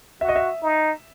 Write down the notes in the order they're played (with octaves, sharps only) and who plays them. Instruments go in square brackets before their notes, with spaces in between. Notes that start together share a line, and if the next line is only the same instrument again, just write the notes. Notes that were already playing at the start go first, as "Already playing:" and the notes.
[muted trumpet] F#4 [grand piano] E5
[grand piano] D#5
E5
[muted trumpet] D#4